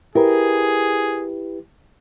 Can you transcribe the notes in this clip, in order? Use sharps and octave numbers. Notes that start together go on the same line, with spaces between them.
E4 G4 G#4 A#4 B4